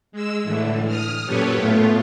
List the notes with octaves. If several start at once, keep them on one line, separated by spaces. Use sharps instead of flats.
G#3 E6
A2 D3 E3
D#6 F6
F#2 A#2 G4 A4 B4 C#5
A2 A3 B3 F4